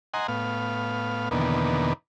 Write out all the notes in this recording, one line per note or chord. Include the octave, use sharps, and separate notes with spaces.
D#5 F#5 G#5 A#5 C6
A2 B3 F5
E2 B2 D3 D#3 A#3 B3